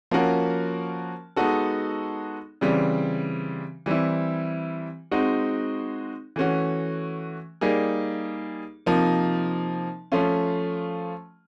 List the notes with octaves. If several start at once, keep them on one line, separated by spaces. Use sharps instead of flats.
F3 A#3 C#4 F#4 A#4
G#3 B3 D#4 F#4 A4
C#3 E3 G3 C4
E3 G3 C4 E4
G#3 C4 D#4 F#4
E3 A3 C#4 F#4
G3 A#3 D#4 G#4
C3 F3 A#3 D#4
F3 A3 C#4 F4